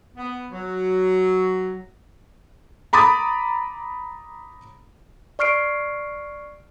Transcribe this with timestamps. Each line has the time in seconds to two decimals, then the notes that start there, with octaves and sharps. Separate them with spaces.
0.17 B3
0.51 F#3
2.93 A#5 B5 D6 D#6 A6
5.39 D5 C#6 F6 C7 D7